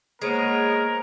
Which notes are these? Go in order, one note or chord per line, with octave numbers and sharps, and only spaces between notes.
G#3 A#3 B3 A#4 C5 C#5